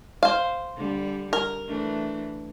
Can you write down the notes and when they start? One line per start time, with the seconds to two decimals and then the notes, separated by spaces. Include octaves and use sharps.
0.23 C5 F5
0.76 D3 G3
1.33 A#4
1.68 E3 A3 D4